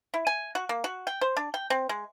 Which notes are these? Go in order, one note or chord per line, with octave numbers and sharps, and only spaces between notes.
E4
G#5
F#4
A#3
F#4
G5
C5
D4
G5
C4
G#3